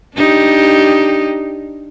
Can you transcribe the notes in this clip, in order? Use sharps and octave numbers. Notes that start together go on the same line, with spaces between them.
D4 D#4 G4